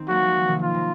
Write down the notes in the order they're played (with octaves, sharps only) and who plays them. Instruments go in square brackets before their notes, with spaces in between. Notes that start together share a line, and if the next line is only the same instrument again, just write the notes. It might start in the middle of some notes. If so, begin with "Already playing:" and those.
Already playing: [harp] D#3 C4
[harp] F#3 A#3 [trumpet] F#4
[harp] F3 G#3
C3 D#3
[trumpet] F4
[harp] C3